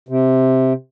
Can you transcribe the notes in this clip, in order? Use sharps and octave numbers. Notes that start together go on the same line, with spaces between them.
C3